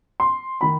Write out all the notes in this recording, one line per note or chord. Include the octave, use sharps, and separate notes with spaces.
C6
D#3 B5